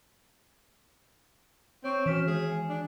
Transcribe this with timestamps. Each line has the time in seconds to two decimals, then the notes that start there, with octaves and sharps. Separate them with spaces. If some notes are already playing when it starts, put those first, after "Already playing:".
1.84 C4 C#5 C#6
2.06 D#3 E3 C#4 F#4 F6 B6 E7
2.27 G#3 G#4
2.52 G#5
2.69 D4